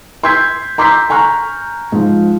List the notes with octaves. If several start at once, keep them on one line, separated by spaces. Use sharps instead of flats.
C6 E6 G6 G#6 B6
A#5 C6 D6 E6 G6 B6
G#5 A#5 C#6 F6 F#6
G#2 F3